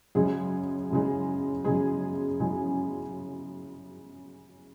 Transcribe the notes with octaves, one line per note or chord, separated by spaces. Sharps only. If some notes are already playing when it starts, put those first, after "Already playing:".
F#2 C#3 G#3 G#4
F#2 C#3 G#3
F#2 C#3 G#3 G#4
F#2 C#3 G#3